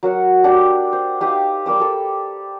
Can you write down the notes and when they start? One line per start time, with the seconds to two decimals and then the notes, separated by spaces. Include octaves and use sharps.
0.03 F#3 A#4 F#5
0.44 D4 F#4 G4 G5
0.93 C5
1.20 D#4 G4 F5 D#6
1.66 G3 A#4 D6 E6
1.80 G3 A4